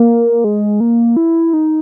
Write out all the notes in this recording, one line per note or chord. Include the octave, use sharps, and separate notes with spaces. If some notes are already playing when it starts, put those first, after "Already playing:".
Already playing: A#3
G#3
A#3
E4
D#4